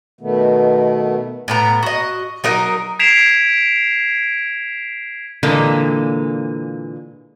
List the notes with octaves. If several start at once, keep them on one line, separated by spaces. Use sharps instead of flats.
B2 D#3 A3 B3
A2 B3 A#5
F#4 D#5
F#3 D#4 A#4
G#6 B6 C7 D7 E7 F7
A#2 D3 E3 G#3 A#3